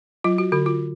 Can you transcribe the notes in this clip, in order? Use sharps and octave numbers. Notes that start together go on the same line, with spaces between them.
F#3 F4
F#4
D3 F#4
F4